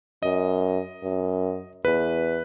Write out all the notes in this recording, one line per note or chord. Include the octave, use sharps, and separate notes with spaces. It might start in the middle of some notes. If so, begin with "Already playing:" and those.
F#2 D#5
F#2
E2 B4